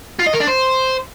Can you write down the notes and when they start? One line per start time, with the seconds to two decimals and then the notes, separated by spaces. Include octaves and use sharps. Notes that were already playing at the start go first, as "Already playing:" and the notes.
0.19 F4
0.26 D#5
0.33 A#4
0.40 D4
0.47 C5